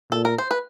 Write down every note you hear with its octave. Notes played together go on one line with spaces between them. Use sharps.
A#2 A4
A#4
C5
B4